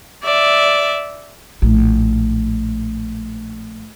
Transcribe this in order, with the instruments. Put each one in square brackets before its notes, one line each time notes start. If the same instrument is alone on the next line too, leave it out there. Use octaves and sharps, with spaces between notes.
[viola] D5 E5
[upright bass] A#1 A2